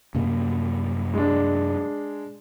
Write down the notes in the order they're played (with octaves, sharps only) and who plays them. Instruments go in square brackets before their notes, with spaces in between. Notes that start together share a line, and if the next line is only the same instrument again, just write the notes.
[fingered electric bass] F#2 C3 A#3
[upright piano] G#3 D4